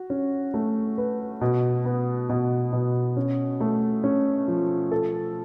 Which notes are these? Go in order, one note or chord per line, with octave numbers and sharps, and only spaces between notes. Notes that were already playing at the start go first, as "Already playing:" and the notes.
Already playing: F#4
C#4
A3
B4
B2
B3
B2
B2
C#4
A3
C#4
F3
A4